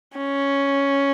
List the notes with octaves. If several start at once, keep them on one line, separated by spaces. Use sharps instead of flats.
C#4